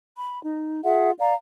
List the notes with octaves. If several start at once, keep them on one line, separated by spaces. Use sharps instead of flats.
B5
D#4
F4 G#4 E5 F#5
D5 F5 A#5